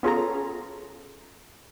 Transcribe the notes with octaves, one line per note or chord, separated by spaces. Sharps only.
B3 C#4 F4 G#4 A4 A#5